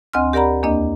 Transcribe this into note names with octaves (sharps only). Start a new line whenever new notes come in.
D2 C4 D#5 G#5 C6 F6
G4 A#4 D5 F#5 A#5 B5
E2 A#3 D4 D#5